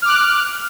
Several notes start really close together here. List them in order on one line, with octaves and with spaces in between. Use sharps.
F6 D6 F#6